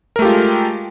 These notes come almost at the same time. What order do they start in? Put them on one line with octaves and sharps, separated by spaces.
A#4 A3 G4 F4 G#3